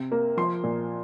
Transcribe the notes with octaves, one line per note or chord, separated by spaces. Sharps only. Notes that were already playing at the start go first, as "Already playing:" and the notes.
Already playing: C3
A#3
F3 C6
A#2